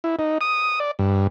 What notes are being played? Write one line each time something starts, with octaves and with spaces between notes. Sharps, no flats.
E4
D#4
D#6
D5
G2